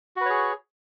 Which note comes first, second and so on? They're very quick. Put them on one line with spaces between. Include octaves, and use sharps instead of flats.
F#4 B4 C#5 G#4